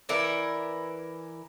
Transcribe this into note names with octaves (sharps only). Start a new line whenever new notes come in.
E3 E4 A#4 D5